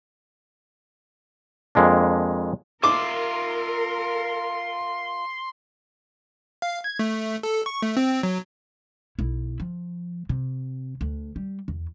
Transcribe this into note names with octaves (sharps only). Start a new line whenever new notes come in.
F2 G#3 A#3 D4
F4 A#4 E5 C6 D6
F5
G#6
A3
A4
C#6
A3
C4
F#3
B1 E4
F3
C3
D2
G3
E2